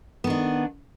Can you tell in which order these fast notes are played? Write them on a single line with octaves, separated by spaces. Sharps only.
B3 D#3 D4